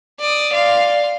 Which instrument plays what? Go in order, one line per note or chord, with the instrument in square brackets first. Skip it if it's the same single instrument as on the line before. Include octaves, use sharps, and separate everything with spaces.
[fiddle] D5 D#6
[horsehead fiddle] D5 [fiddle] F5 C6